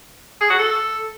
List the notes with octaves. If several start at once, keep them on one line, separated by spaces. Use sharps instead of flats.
G#4
F#4
A4